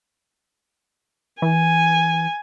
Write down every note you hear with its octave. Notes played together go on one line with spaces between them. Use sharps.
E3 G#5